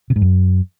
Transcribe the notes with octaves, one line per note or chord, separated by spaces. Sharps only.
C3
G#2
F#2